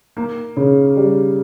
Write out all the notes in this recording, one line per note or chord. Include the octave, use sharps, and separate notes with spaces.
A#3
C#3
G3